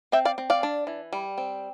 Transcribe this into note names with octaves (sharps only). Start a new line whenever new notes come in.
C4 E5 G5
D5 F5
C4
D5 F5
D4
E3
G3
C4